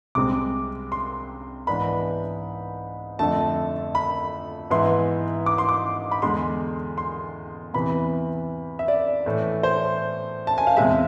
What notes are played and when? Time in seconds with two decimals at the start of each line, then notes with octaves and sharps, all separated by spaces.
0.15 C2 C3 G#3 C4 D6
0.92 C6
1.67 G#2 E3 B3 D4 B5
3.19 F2 D3 A3 A5
3.95 B5
4.70 G#2 E3 B3 E4 C6
5.46 D6
5.58 C6
5.69 D6
6.11 B5
6.22 E2 D3 G#3 C6
6.98 C6
7.73 E2 C3 E3 B5
8.79 E5
8.88 D5
9.26 A2 E3 A3
9.63 C5
10.47 A5
10.58 G#5
10.67 F5
10.77 E2 C3 G#3 E5